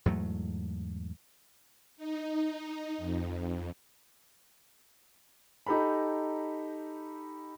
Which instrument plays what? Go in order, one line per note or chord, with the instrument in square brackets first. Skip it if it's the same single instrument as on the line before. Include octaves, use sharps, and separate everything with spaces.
[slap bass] E2 G#2 F#3 A3
[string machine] D#4
F2
[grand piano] D#4 G4 A4 A#5 B5